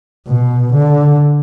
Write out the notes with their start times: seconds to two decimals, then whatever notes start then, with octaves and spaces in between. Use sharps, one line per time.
0.28 B2
0.74 D3